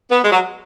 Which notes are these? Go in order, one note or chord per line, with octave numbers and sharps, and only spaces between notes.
B3
G#3
F#3